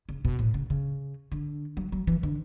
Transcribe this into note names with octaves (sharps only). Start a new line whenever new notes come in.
C#3
B2
A2
C#3
C#3
D3
F#3
F#3
E3
D3